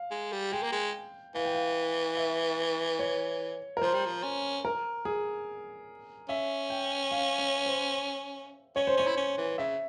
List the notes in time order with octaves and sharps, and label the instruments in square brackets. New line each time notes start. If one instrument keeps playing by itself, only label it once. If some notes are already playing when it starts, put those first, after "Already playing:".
Already playing: [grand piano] F5
[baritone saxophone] G#3
G3
[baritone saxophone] G#3 [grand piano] G5
[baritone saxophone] A#3
G#3
[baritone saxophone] E3 [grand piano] F5
[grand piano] G5
F5
E5
C#5
A#4
[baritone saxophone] F3 [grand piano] C5
[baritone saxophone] G3
F3
C#4
[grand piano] A#4
G#4
[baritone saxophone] C#4 [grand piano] E5
[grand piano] G5
F5
C#5
C5
[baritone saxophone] C#4 [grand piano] C#5
[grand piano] C5
[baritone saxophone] C#4 [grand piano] C#5
[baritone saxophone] E4
C#4
E3
[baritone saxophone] C#3 [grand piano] E5